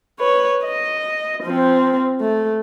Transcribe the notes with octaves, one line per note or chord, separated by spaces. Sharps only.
B4 C#5
D#5
F3 C4
A3